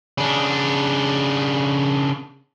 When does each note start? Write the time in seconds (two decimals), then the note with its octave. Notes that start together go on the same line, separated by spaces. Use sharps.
0.18 C#3 D4